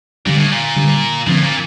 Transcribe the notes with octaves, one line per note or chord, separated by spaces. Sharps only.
A#2 D3 G3 D4
A2
A#2
D3 G3 D4
A2 D3 F3 C4
A#2